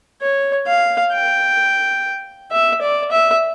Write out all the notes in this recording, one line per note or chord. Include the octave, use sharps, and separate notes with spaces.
C#5
F5
G5
E5
D5
E5